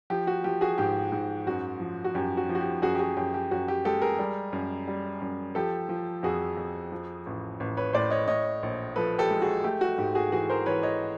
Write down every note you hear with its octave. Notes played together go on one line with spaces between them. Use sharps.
F3 G4
F#4
F3 G4
F#4 G#4
G#2 G4
G#2
F#2 F#4
F3
F#4
F#2 G4
F#4
F3
F#4
G4
F#2 F#4 G#4
G4
F#4 G#4
F#2 G4
G4
F#2 F#4
G4
G#3 G4 A4
G#4 A#4
G3
F#2
G3
F#2
F3 G4 A4
F3
F2 F#4 G#4
F2
F3
A1
A1
B4 C#5
A2 C5 D5
C#5 D#5
A2 C#5 D#5
A#1
F3 A4 B4
G4 A4
G#3
F#4 G#4
A3 G4
F#4
G#2 G4
F#4 G#4
E3 F#4 G#4
A#4 C5
E3 B4 C#5
C#5 D#5